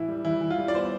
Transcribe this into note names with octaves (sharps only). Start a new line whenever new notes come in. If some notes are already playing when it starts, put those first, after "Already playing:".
Already playing: A2 E3 E4
G3
E3 E4
E3
F4
G3
D5
B3 C5